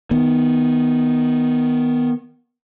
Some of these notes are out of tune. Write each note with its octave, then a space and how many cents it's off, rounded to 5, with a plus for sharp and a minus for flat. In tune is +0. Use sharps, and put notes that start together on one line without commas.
D#3 +0 B3 +0